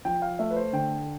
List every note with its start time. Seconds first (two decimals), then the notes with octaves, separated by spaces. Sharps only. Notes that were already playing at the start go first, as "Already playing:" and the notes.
0.05 F3 G5
0.22 F5
0.39 A3 E5
0.51 B4
0.56 C5
0.73 D3 G5